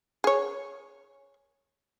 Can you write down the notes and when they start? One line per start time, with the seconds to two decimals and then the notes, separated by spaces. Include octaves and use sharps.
0.24 G#4 C#5